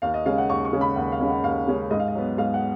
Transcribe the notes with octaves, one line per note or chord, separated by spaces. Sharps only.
D#2 F5
D#5
C#3 G#3 C#4 F5
F#5
D#2 C#6
C#6
C#3 G#3 C#4
B5
D#2 F#5
F5
C#3 G#3 C#4
F#5
D#2 F5
C#3 G#3 C#4
G#2 D#5
F5
D#5
F#3 B3
G#2 F5
F#5